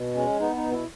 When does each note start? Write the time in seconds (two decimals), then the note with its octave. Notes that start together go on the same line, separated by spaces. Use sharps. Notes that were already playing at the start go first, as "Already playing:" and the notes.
Already playing: B2
0.15 G#3 C#4
0.40 B3 D#4
0.56 D#4
0.64 B2
0.72 E4